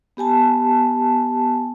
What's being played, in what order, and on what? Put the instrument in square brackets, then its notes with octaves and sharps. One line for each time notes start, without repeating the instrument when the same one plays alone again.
[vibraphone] B3 G4 G#5 A5